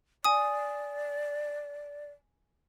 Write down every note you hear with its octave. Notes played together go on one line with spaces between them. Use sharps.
D5 G#5 D#6